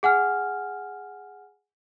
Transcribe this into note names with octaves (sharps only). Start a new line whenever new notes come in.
G#4 F#5 G#5 F6